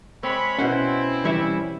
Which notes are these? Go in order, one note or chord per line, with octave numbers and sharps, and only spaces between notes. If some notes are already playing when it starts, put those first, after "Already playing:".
G#3 C4 C#5 B5
B2 C4 C#4 E4 C5 F#5
E3 G3 C#4 C#5 E5